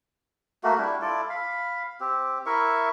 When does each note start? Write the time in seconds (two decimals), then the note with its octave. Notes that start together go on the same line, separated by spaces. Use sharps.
0.64 A3 A#3 F#4
0.78 G3 D4 E4
1.02 E4 F4 A4 D5
1.29 F5 B5
2.00 C4 G4
2.46 E4 A#4 E5 C#6